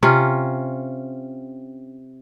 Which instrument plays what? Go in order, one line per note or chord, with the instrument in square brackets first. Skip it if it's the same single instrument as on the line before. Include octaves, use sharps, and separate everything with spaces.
[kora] C3 C#4 F4